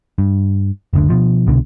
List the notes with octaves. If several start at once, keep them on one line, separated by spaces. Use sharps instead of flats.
G2
F#1 D2 D3
B2 F3
C2 B2 D3